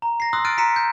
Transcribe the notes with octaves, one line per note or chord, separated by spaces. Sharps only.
A#5
A#6 C7
C6 D#6 E6 F#6
F6 F#6 A6 D7 D#7
A#5 B6 C#7 D#7 E7
G6